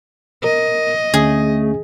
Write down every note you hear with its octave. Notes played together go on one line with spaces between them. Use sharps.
A#4 D#5
D2 D3 A3 C#4 G#4